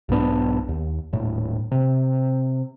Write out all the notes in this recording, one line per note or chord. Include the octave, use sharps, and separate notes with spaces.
B1 G#2 B3 D4
D#2
D#1 A2
C3